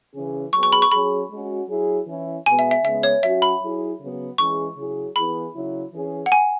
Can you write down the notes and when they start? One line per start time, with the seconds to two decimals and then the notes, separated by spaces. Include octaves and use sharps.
0.14 C#3 E3 C#4 G#4
0.53 F#3 B3 G#4 C#6
0.63 C#6
0.72 B5
0.82 C#6
0.92 F#3 C#4 G#4 B5
1.30 G#3 C#4 F#4
1.68 F#3 E4 G#4
2.07 E3 C#4 E4
2.46 B2 G#3 B3 G#5
2.59 E5
2.71 E5
2.84 C#3 G#3 B3 E5
3.03 C#5
3.23 F#3 C#4 F#4 E5
3.42 B5
3.61 F#3 E4 G#4
3.99 C#3 F#3 B3
4.38 E3 G#3 C#4 G#4 C#6
4.76 C#3 F#3 E4 G#4
5.16 E3 B3 E4 G#4 B5
5.54 C#3 F#3 E4
5.93 E3 C#4 G#4
6.26 F#5
6.32 G#5